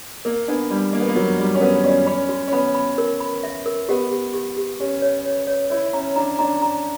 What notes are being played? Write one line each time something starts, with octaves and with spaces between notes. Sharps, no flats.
A#3 A#4
B3 D4
G3 D4
A#3 D4
B3
A#3
F#3 A#4
G3 D4
C#4
B3 A#4
C#4 D5
C#4 B5
F#4
C#4
B3 B5
B5
A#4
B5
E5
A#4
B3 G4
G4
G4
G4
C#4 G4
C#5
C#5
C#5
E4 C#5
C#4 A#5
D4 A#5
D4 A#5
A#5